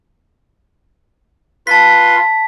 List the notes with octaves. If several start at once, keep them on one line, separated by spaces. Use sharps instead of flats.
F4 B4 A5 C6 B6